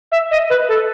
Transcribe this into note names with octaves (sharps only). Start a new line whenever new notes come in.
E5
D#5
B4
A4